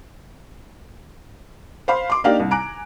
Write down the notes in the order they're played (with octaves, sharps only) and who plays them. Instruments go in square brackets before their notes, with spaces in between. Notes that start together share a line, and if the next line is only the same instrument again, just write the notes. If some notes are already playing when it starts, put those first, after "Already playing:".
[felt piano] C5 F5 B5 C6
C6 D6
A#3 D4 D#4 G4 F5
C2
G#5 A#5 D6 F#6 D7